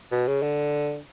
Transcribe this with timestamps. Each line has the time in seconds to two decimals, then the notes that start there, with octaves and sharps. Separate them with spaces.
0.12 B2
0.27 C#3
0.42 D3